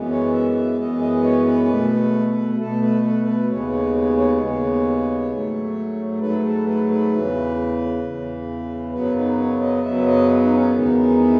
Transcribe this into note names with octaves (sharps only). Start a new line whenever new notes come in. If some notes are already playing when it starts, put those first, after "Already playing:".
Already playing: F#2 E3 G#3 B3
C#5
E5
E5
F#2 E3 G#3 B3 D#5
D#5
C#5
B4
B2 A3
B2 A3 A4
B4
B4
B4
D#2 C#3 G#3 B3 C#5
C#5
C#5
C#5
D#2 C#3 G#3 B3
G#2 F#3 A3
G#2 F#3 A3 B4
A4
B4
B4
E2 C#3 E3
E2 C#3 E3
F#2 C#3 F#3 B3 B4
D#4
C#5
D#5
F#2 C#3 F#3 B3 E5
D#5
D#4
C#4
E2 D#3 G#3 B3 D#4
E4